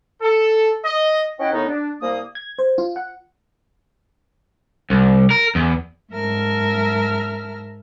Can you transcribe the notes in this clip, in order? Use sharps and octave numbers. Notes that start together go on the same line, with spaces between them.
A4
D#5
B2 C#4 E4 D#5 F#5 G5
D#2 A2 B3 D#4
D4
C2 A#3 D#6
G#6
C5
F4
F#5
C2
A#4
E2
G#2 A#4 E5 A5 F6